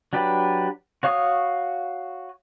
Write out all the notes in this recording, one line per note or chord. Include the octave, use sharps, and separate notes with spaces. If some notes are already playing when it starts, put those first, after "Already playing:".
F#3 D4 G4 B4
F#4 C#5 F5 C#6 D#6